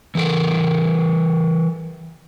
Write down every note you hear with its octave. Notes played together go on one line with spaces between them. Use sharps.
E3 A4 A#4